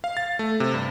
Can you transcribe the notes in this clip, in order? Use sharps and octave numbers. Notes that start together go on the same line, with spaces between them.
F5
A6
A3
C3
G2